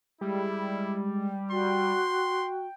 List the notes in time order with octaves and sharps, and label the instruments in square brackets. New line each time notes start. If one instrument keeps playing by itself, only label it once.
[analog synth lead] G3 [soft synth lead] G#3 [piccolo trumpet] E4
[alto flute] F#4 [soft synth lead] G5 [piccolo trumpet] C6